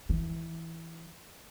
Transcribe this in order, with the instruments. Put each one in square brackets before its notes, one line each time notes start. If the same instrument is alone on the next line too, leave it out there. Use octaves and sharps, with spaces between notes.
[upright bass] E3